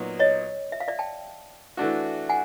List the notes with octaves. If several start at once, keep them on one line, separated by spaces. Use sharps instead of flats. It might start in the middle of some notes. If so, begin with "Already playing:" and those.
Already playing: A#2 F#3 B3 D#4
C#5 D#5
E5
F5
D5 E5
G5 A5
E3 A3 D4 F#4
F#5 G#5